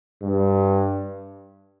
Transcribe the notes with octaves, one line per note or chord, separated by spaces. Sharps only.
G2